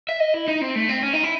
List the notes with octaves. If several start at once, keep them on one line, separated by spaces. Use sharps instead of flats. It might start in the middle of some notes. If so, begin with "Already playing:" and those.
E5
D#5
E4
D#4
C4
A3
C4
C#4
D#4
E4